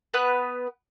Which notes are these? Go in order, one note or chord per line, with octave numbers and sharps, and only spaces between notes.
B3 B4 F#6